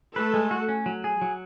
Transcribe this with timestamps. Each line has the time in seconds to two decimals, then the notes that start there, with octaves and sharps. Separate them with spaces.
0.16 A3 A4 B4
0.34 G#3
0.51 F#4
0.68 C#4
0.86 F#3
1.04 G#4
1.22 F#3